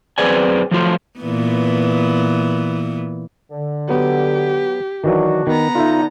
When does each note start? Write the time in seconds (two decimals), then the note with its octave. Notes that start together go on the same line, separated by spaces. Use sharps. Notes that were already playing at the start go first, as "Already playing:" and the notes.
0.18 F#2 C4 G#4 B4 D5 G#5
0.71 F3 F#3 A3 F4
1.19 A#2 E3 B3
3.51 D3
3.89 F#3 B3 G4
5.04 D#3 E3 F#3 D4 F#4
5.47 D#3 B3 A#5
5.75 D3 D#4 F4 E5